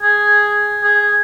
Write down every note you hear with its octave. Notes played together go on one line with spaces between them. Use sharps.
G#4
G#4